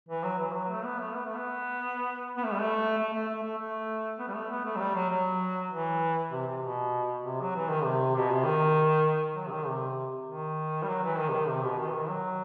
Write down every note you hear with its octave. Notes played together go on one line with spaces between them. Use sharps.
E3
F#3
E3
F#3
A3
B3
A3
B3
A3
B3
B3
A3
G3
A3
A3
A3
A3
A3
A3
B3
G3
A3
B3
A3
F#3
G3
F#3
F#3
E3
C3
C3
B2
C3
F#3
E3
D#3
C3
B2
C3
D#3
F#3
C3
D#3
C3
D#3
G3
F#3
E3
D#3
C3
D#3
C3
B2
D#3
E3
D#3
F#3